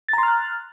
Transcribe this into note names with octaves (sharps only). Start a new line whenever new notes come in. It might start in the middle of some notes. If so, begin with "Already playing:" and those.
A#5 C6 F6 F#6 A6